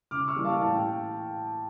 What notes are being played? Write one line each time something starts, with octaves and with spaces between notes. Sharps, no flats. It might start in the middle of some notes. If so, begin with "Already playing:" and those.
C#3 D6 F6
C#6 E6
E3 G3 A#3
F5 A5
A2 A5
G5